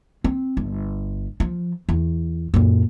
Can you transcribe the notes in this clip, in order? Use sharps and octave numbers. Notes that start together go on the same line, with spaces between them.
C4
G1
F3
E2
F#2 A#2